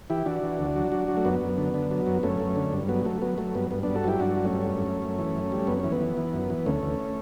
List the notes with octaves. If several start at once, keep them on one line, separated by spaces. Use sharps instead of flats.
E3 E4 G4
E3 D4 F#4
E3
D2
F#3
F#3
F#3
A3
F#2 B3
F#2
D3
D3
F#3
F#2
F#2 A3 C#4
F#2
D3
G2
F#3 B3
F#3 A3
F#3 B3
F#3 A3
G2 B3
G2 B3
G2 B3 D4
F#4 A4
F#3 E4 G4
G2 D4 F#4
F#3
A3 C#4
G2
F#2
F#2
F#2
E3
F#2
G3
F#2 B3
E3 C#4
B3
E3
E3
F#2
E3
D2 A3 C#4
D2